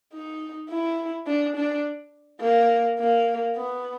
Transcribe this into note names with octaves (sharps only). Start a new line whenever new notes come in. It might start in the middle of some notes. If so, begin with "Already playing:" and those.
D#4
E4
D4
D4
A#3
A#3
B3